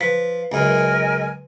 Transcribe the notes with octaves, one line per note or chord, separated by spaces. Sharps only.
F3 B4 B6
C#2 F#2 A#4 D#5 G#5